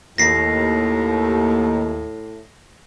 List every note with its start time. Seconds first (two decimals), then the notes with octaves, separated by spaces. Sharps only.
0.18 D#2 A2 A#6 C7